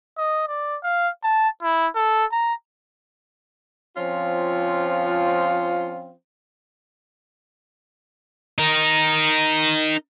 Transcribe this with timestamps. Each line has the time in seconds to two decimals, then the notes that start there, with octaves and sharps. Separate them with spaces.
0.18 D#5
0.48 D5
0.83 F5
1.24 A5
1.62 E4
1.95 A4
2.32 A#5
3.97 F3 C4 C#4 F4
8.58 D#4 A#4